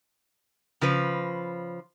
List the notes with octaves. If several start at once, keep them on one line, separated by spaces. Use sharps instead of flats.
C#3 F3 B4